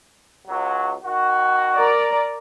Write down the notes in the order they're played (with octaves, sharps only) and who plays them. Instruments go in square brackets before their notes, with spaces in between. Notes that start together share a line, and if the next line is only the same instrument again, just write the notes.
[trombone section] C#2 F#3
D#3 F#4
[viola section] A#4 D5 A#5